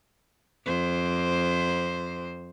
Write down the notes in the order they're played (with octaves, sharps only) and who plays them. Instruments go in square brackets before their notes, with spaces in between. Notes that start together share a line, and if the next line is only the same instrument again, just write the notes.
[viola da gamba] F2 C5